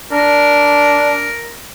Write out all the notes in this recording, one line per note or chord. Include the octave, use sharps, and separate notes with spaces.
D4 A#4